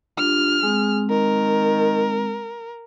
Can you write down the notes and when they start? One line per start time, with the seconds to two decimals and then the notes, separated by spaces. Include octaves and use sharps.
0.17 D4 F4 G4 F6
0.63 G#3 C4 G#4
1.10 D#3 A#4